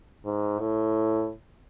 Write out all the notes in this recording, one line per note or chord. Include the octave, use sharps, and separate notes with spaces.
G#2
A2